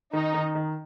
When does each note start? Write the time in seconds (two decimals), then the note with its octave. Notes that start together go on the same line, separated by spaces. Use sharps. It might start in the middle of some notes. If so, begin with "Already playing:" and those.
0.13 D#3 D#4
0.34 D#3
0.55 D#3